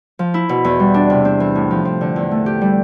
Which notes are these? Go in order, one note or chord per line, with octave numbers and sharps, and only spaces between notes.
F3
E4
B2
E2
G3
D4
C3
C4
E3
A2
F3
C4
D3
E2
A3
G4
G3